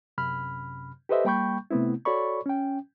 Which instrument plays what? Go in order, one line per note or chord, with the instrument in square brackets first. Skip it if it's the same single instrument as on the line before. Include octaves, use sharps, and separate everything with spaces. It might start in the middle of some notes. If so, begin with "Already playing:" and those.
[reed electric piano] F#2 C3 B5 F6
G4 A4 B4 C5 D#5 E5
G3 A#3 G5 B5 C#6 G6
C3 A3 B3 C4 E4
F#4 A4 C#5 D5 B5 C#6
C#4 G5